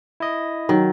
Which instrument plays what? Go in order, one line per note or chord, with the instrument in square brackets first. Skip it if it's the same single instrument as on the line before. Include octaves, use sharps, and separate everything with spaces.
[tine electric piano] E4 D#5
[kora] D#3 [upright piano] F#3